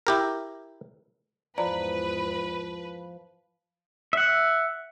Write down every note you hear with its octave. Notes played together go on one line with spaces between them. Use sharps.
E4 G4 A#4
E2 G#2 F3 B4 D5 A#5
E5 F#5